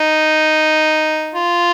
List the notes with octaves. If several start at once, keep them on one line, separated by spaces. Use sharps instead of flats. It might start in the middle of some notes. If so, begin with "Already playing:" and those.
Already playing: D#4
F4